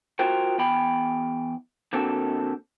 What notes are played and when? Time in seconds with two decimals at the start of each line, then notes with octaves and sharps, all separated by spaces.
0.19 F4 F#4 A#4 C5 G5
0.58 E2 G5 B5
1.93 D3 A#3 C4 F#4 A4